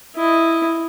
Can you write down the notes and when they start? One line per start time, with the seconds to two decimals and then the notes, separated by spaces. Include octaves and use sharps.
0.16 E4 D#5